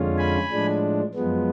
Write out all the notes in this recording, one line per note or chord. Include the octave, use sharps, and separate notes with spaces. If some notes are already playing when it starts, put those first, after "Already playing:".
Already playing: F2 D3 G#3 C#4 F4
G#5 B5
A2 F3 G#3 D4
F#2 F3 G#3 B3